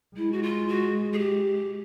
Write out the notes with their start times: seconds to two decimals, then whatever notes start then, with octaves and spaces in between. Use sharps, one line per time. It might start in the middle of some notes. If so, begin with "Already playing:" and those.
0.16 G#3 E4
0.32 F#4
0.43 F4
0.68 F#4
1.13 G#4
1.19 G4